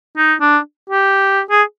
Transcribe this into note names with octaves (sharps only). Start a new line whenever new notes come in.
D#4
D4
G4
G#4